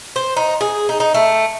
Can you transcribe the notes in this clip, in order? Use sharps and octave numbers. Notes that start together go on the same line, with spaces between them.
C5
D#4
G#4
D#4
D#4
A3